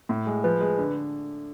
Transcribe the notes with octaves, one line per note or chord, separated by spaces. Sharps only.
A2
G#3
F3 B4
G#3
D3